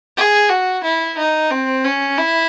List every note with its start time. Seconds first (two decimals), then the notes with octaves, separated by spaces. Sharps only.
0.17 G#4
0.49 F#4
0.83 E4
1.18 D#4
1.51 C4
1.84 C#4
2.18 E4